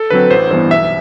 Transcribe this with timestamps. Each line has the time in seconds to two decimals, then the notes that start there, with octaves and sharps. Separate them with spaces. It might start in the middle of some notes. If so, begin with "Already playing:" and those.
Already playing: A4
0.10 D3 F#3 C4 B4
0.31 A1 C5
0.50 G2 E3 B3 C5
0.71 B1 E5